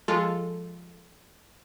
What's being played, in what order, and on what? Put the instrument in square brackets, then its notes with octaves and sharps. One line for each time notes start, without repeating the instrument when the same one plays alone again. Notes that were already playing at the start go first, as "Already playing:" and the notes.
[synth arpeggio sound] F3 G#3 F4 A4